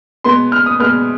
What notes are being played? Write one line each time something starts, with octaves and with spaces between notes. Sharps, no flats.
B2 G#3 B3 C6
F6
D#6
B2 G#3 B3 F6